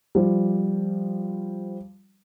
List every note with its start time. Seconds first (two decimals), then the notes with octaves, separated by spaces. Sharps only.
0.15 F3 G3